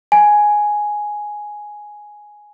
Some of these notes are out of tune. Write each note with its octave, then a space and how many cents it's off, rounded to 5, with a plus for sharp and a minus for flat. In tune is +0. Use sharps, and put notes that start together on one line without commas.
G#5 +5